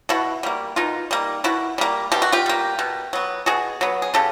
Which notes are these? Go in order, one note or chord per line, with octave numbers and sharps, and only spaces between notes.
B2 E4 F#4
G3 A#3
B2 D#4 F4
G3 A#3
B2 E4 F#4
G3 A#3
B2 G4
F#4
F4 G4
G3 A#3
B2
F#3 B3
B2 F#4 G#4
F#3 B3
G#4
C#3 G4 A4